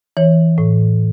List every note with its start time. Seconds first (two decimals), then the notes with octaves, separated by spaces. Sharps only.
0.17 E3 C#5
0.58 A2